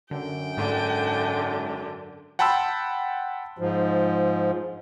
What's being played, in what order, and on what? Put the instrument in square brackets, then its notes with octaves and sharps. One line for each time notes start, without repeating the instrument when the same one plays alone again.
[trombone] F#2 [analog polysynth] D3 [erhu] G5
[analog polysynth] G#2 [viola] D3
[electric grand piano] F#5 G5 A5 B5 C6 E6
[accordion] G#2 F3